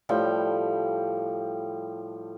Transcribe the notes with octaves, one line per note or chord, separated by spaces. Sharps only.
A2 F3 G3 G5